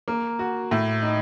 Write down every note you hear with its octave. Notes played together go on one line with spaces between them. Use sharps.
A#3
F#4
A2
D#4